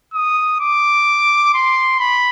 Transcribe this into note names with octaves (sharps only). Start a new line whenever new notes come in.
D#6
D6
C6
B5